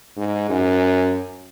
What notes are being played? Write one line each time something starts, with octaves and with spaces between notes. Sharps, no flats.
G#2
F#2